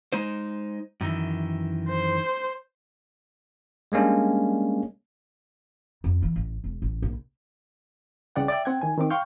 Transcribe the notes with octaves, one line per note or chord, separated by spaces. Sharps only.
G#3 D#4 C5
F#2 D#3 E3
C5
G3 G#3 A#3 C#4 D4
F2
E3
A1
E1
A1
A#1
C2 C#3 D5 F#5 G5
D5 E5 G5
C4 F#5 G5 G#6
D#3 G#5
D#3 C4 D6
F5 G5 C6 C#6 F6 G6